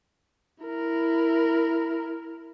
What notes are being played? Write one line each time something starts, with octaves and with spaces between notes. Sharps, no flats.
E4 A#4